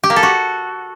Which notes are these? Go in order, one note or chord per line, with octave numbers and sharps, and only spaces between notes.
G4
A#3
A4
F#4